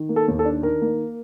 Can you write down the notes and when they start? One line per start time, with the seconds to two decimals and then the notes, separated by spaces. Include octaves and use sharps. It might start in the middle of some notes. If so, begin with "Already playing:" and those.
Already playing: D#3
0.09 A#3
0.16 A4
0.28 D#2
0.39 A4
0.45 D4
0.63 D#3 A#4
0.82 A#3